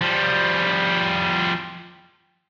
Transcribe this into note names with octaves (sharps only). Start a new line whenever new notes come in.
F3 G3